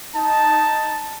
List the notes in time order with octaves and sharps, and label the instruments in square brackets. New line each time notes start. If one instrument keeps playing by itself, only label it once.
[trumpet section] D#4 A5